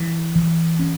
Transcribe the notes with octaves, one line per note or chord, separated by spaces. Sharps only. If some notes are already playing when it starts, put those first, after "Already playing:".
Already playing: E3
E3
C#4